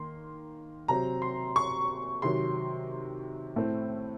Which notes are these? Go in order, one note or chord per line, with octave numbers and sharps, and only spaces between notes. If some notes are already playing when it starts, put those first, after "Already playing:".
Already playing: D#3 A#3 C6
C3 F#3 C4 A#5
C6
C#6
C3 D#3 F#3 C6
A2 A3 C4